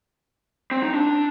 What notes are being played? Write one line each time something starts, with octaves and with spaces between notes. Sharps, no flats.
C4
D#4
D4